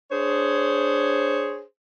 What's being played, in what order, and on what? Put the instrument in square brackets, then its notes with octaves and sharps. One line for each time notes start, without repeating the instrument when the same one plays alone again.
[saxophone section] D4 G#4 C5 C#5